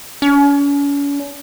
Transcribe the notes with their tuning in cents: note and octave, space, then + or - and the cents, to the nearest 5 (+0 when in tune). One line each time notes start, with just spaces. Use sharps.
C#4 +40